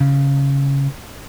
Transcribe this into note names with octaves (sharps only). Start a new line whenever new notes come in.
C#3